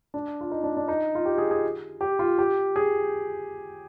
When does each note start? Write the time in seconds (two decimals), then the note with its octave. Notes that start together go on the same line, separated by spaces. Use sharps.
0.14 D4
0.41 F4
0.51 D#4
0.64 D4
0.77 D4
0.88 D#4
1.15 F4
1.26 G4
1.38 G#4
1.51 G#4
2.01 G4
2.19 F4
2.39 G4
2.76 G#4